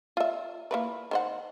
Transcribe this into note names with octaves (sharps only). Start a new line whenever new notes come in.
F4 E5
A#3 E4 B4
D#3 C5 F#5